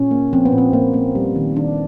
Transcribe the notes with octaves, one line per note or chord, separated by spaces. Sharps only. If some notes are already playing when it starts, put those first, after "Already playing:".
Already playing: A#2 C#4
A#3
F3 C4
B3
A#2
C4
A#2 A#3
A#3
G3
D#3
D#3 D4